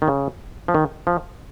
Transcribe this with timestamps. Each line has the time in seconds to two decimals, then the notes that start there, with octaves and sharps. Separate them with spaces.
0.02 D#3
0.08 C#3
0.68 F3
0.74 D#3
1.07 F3